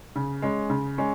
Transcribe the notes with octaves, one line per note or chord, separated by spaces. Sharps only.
C#3
G#3 C#4
C#3
G#3 C#4